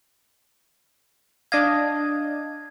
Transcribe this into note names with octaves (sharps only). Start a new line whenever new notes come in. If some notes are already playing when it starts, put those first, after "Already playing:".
D4 D#5 F5 G#6